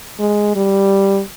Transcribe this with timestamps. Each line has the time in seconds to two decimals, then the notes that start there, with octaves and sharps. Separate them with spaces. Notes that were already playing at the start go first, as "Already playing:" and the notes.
0.19 G#3
0.56 G3